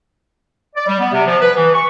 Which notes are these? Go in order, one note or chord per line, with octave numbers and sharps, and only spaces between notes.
D5
G3
B3
C3
F3
B4
E3
C#6